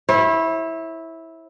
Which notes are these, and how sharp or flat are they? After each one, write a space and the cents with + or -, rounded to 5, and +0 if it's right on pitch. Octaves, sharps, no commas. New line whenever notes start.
E4 -10 C#5 -45